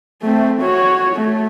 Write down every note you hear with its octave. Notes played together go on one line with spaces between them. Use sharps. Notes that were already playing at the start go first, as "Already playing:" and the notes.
A3 C4
F#4 C#5
A3